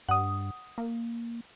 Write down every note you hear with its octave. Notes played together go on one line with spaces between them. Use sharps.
G2 F#5 D#6
A#3